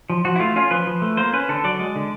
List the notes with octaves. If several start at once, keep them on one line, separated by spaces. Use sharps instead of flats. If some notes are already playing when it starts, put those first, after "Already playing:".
F3
F3 F#4
E4
A3 F4
C#4 F4
F3 B4
F3
A3
A#3 C5
C#4 B4
D3 A4
F#3 D5
G#3
D3